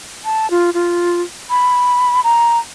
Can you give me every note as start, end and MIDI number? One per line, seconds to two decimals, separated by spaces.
0.25 0.49 81
0.50 0.70 65
0.74 1.22 65
1.50 2.21 83
2.24 2.59 82